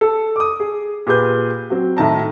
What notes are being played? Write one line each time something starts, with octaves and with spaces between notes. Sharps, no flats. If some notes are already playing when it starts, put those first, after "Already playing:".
A4
D6 D#6
G#4
A#2 G4 G#4 B4 G6
F#3 C4
A2 D#3 A5 A#5